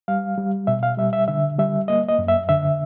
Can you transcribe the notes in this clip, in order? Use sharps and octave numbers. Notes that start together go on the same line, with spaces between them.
G3 F5
G3
B2 E5
F5
G3 E5
E5
D3 E5
G3 E5
A#3 D#5
D#5
F#2
E5
D3 E5